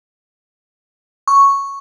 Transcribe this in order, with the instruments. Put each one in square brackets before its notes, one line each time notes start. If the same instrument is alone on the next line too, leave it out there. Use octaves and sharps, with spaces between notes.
[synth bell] C#6